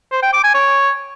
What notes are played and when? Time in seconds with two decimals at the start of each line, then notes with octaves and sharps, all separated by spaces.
0.12 C5
0.23 G5
0.33 D6
0.44 G#5
0.54 C#5